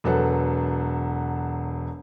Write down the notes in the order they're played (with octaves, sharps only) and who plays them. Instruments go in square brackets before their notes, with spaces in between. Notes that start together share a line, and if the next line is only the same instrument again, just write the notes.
[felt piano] E1 F#3 A4 B4 F#5